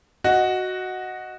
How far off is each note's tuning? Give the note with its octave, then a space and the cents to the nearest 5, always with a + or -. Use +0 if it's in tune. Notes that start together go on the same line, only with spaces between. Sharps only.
F#4 +0 D#5 +0